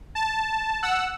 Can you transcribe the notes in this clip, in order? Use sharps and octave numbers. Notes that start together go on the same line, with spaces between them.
A5
F#5 E6